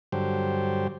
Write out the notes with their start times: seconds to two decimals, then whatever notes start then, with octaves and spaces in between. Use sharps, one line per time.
0.12 G2 D3 F#3 G4 C5